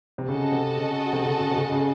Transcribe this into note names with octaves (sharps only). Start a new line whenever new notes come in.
C3
C#3 F#4 A4 D#5 A5
C3
C#3
C3
C#3
C#3
C3
C#3
C#3